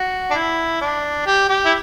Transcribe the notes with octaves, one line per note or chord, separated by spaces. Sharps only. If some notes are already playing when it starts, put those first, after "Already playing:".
Already playing: F#4
D4
E4
D4
G4
G4
E4